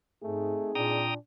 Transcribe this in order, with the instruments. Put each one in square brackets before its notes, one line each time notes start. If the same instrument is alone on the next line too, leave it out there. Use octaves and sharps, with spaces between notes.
[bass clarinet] G#2 [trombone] A3 [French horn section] C4 D#4 G#4
[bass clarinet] A#2 [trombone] D4 [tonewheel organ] G5 A#5 D#6